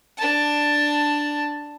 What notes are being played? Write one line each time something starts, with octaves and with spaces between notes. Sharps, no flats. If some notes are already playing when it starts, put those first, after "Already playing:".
D4 A5